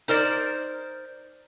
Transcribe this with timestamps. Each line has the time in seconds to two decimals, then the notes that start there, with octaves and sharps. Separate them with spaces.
0.08 D#4 A#4 C5 D5